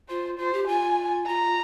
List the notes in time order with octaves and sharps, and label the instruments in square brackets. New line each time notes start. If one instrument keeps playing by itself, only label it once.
[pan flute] F4 [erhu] C5
[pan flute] F4 [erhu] C5
[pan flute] G4
[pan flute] F4 [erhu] G#5
[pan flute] F4 [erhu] A#5